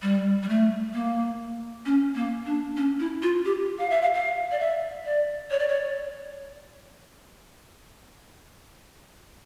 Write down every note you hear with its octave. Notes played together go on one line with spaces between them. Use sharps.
G3
G3
A3
A#3
C#4
A#3
D4
C#4
E4
F4
G4
F5
E5
F5
F5
D5
E5
D5
C#5
D5
C#5